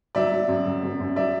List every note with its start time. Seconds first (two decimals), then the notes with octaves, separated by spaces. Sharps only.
0.15 F#3 D5 E5
0.32 F#3
0.48 F#2
0.66 F#2
0.83 F#2
1.00 F#2
1.16 F#3 D5 E5